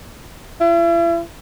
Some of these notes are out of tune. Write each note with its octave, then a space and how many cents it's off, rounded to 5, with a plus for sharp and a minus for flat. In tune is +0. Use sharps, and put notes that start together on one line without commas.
E4 +40